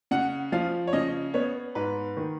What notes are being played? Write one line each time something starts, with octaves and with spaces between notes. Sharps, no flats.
C#3 F#5
F3 F5
C#5
C#3 D#5
B3 C#5
G#2 B4
D#3